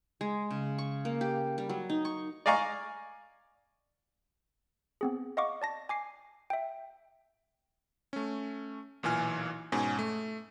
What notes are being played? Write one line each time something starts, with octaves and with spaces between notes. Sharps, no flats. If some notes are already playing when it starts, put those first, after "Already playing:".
G#3
C#3
C#6
A#3
G4
G3
F#3
D#4
C#6
D5 D#5 F5 G#5 A#5 C#6
B3 C4 G#4
D#5 F5 F#5 C#6 D6
D5 A5 A#6
G#5 D6 C7
E5 G5
A3 C#4
B1 A#2 E3 G#5 F6
G#2 B2 C#4 G#5
A3